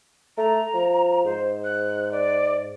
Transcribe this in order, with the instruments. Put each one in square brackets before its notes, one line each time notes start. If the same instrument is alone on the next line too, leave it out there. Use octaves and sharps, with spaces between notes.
[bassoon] A3 [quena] A#5
[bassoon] F3
[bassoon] G#2 [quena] C5
[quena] F#6
D5